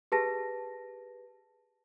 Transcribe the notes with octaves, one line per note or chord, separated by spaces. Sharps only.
G4 G#4 B4 A5 A#6